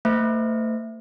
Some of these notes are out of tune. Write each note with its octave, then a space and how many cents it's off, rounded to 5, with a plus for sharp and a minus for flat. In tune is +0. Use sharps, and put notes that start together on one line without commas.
A3 +35 C5 -35 E5 +0